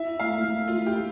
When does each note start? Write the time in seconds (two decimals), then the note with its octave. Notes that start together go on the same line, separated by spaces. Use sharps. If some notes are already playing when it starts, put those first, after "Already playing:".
Already playing: E4 E5
0.20 A3 F5
0.48 A3
0.68 F4
0.77 E4
0.87 G4